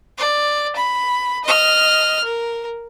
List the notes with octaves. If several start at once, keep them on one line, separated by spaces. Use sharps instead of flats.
D5
B5
D#5 F6
A#4